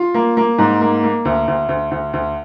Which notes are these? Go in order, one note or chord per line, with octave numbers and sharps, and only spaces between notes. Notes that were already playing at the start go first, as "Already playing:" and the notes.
Already playing: F4
A#3
A#3
G#2
A#3
A#3
D2
D2
D2
D2
D2